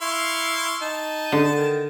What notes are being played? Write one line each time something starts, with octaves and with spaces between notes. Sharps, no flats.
E4 F5 C6 C#6
D#4 A5
D3
D#3